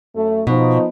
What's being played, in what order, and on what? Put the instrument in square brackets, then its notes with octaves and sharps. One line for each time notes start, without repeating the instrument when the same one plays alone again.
[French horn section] F#2 A3
[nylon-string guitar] B2 [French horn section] F3 D#4